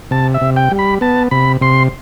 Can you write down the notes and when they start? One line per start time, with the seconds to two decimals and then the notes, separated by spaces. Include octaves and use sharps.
0.11 C3 A5
0.34 E5
0.41 C3
0.56 G5
0.71 G3
0.79 B5
1.01 B3 A5
1.31 C3 B5
1.61 C3 C6